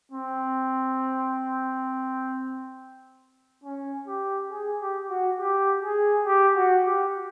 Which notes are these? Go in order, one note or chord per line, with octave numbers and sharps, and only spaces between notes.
C4
C#4
G4
G#4
G4
F#4
G4
G#4
G4
F#4
G4